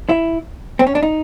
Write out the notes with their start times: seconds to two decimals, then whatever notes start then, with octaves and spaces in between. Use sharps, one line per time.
0.09 E4
0.79 C4
0.87 C#4
0.95 D4
1.02 D#4